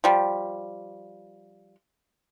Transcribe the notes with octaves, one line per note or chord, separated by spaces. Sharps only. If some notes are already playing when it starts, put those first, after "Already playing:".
F3 G3